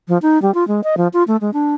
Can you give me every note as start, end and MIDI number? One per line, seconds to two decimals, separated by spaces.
0.08 0.18 53
0.22 0.41 63
0.42 0.54 55
0.54 0.66 65
0.68 0.81 56
0.84 0.95 75
0.97 1.08 53
1.13 1.24 65
1.28 1.37 57
1.41 1.50 56
1.54 1.75 62